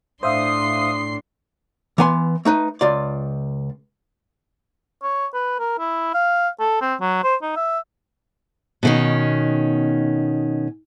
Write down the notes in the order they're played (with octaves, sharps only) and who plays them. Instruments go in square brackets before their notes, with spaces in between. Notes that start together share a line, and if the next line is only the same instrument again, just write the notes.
[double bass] A2 D4 [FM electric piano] C5 E5 F5 [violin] C6 C7 [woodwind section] D#6
[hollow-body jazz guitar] E3 B3 G#5 C6
A3 D#4 B4
C#2 F4 D5
[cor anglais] C#5
B4
A#4
E4
F5
A4
C4
F#3
C5
D#4
E5
[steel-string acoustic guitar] B2 D#3 C#4